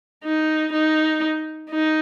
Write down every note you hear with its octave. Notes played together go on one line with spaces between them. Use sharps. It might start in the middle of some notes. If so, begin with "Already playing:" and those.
D#4
D#4
D#4